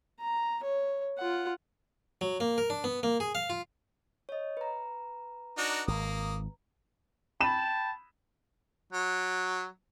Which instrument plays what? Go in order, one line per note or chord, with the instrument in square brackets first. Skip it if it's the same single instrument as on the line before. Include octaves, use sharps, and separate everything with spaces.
[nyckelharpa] A#5
C#5
F4 F#5
[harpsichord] F#3
A#3
A#4
D4
B3
A#3
G#4
F5
F4
[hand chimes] C#5 D#5
B4 A#5
[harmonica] D4 D#4 F#4
[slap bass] G#1 [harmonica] A#3 D#6
[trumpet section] G5 A5 [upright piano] B5 E7
[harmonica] F#3